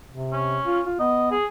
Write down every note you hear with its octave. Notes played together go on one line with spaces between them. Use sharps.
C3
C#4
F4
F4
B3 D#5
G#4